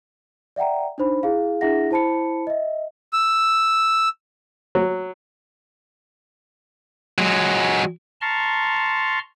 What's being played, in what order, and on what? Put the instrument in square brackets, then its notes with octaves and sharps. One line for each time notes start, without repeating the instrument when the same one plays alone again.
[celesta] D5 E5 F#5 G5 A#5
D4 D#4 C5 B5
E4 G#4 F5
D4 E4 G#4 E5 F#5 A#6
E4 C5 A5 B5 C#7
D#5 E5
[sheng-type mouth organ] E6
[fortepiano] F#3
[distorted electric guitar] F#3 G#3
[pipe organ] A5 A#5 C6 C#6 F6